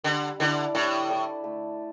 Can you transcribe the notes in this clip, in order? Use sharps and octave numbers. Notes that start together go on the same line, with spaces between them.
D3 G3
D3 E4 A4 D5
A2 G3
E4 A4 D5
A3